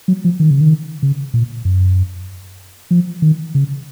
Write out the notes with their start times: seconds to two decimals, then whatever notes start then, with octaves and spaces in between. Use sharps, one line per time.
0.08 F#3
0.25 F3
0.40 D#3
0.51 C#3
0.61 D#3
1.03 C#3
1.34 A#2
1.65 F#2
2.91 F3
3.22 D#3
3.55 C#3